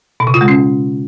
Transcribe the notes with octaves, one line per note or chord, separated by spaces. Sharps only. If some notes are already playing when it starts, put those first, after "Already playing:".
B2
C#3
F4
G#3
C#4